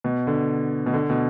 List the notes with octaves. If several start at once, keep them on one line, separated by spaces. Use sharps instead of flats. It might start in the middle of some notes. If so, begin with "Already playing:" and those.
B2
D3
B2
D3
B2